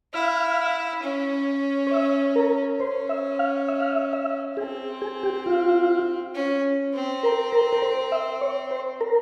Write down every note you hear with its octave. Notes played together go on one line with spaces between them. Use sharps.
E4 F5
C#4
C#5
E5
A#4
C#4 C5
E5
F5
E5
F5
E5
E5
C4 G#4
G#4
G4
F4
C#4
C4
A#4
A#4
A#4
C5
E5
C#5
C5
A#4